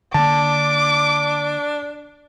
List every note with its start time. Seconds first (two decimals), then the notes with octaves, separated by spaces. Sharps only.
0.14 D3 A#3 D4 A5 D6